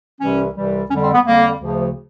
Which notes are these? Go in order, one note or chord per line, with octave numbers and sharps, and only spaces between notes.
C2 C3 E3 G3 C#4
C2 C3 E3 G3
F2 D3 G3 C#4
C4
B3
F2 D3 G3 A#3
D2 C#3 F3